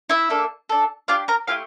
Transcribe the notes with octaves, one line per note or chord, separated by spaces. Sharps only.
E4 E5
A#3 D4 A4
D4 A4
D4 F4 G4 F5
A#4 A#5
A3 E4 F4 G4 F5